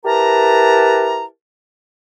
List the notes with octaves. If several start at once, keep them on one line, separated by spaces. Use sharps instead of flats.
E4 G4 A#4 B4 A5 A#5